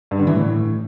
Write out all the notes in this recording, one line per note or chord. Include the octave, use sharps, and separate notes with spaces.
G2
D3
E3
A2